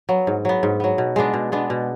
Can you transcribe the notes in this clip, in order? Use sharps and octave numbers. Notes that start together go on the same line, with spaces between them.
F#3 B3
G#2
F#3 B3
G#2
F#3 B3
B2
G#3 B3 D4
B2
G#3 B3 D4
B2